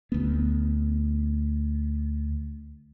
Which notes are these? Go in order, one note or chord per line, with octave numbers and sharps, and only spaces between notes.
D2 B3